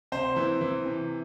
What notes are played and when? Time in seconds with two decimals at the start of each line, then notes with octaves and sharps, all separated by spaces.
0.12 C3 C5
0.36 E3
0.61 E3
0.86 C3